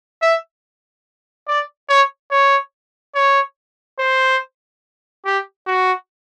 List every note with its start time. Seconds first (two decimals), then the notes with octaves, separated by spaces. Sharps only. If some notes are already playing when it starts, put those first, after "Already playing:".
0.22 E5
1.47 D5
1.89 C#5
2.31 C#5
3.15 C#5
3.99 C5
5.26 G4
5.67 F#4